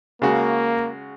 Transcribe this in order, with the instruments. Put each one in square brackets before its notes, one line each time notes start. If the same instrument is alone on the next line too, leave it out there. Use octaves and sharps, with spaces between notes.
[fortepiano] C#3 G#3 F#4 [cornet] A#3